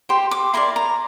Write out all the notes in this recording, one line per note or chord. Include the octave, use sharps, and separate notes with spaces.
G4 C5 C6
D6
E4 A#4 D5 C6
A#5